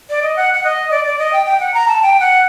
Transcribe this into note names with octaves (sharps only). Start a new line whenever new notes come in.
D5
D#5
F#5
F#5
D#5
D5
D5
D#5
G5
G5
F#5
A#5
A5
G5
F#5